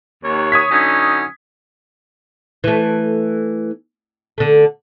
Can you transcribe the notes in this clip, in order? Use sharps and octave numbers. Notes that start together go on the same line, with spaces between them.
D#2 C#5
D#6 G#6 B6
D3 F#3 C#4 D#4
E3 A3
D3 A3